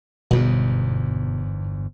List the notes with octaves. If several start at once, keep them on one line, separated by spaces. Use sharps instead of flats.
G1 E2 G#2 B2